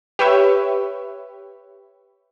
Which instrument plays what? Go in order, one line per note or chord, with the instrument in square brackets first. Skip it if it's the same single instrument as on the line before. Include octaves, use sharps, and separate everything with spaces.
[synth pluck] G4 B4 C#5 E5